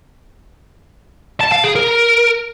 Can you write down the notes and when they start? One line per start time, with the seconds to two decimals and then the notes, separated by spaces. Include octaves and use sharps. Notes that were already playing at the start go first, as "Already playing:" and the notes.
1.40 A5
1.52 F5
1.64 G#4
1.75 A#4